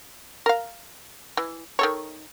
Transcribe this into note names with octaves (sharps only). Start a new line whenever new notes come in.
A#4 F5
E3
D#3 A4 C#5